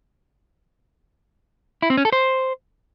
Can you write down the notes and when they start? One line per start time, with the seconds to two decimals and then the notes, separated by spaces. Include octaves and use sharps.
1.82 E4
1.90 C4
1.97 C#4
2.05 A4
2.13 C5